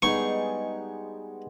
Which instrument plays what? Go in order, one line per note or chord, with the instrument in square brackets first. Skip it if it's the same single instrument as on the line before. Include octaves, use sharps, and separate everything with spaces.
[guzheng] G3 D#4 G#4 [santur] G#3 B3 [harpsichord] C#6